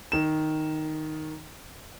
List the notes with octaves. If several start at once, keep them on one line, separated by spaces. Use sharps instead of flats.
D#3 E7